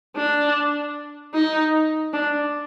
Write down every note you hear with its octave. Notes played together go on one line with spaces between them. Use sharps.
D4
D#4
D4